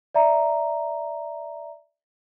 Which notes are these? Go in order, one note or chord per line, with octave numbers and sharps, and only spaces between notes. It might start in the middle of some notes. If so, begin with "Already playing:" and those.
D5 E5 A#5